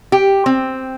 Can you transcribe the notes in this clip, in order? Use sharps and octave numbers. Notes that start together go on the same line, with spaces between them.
G4
C4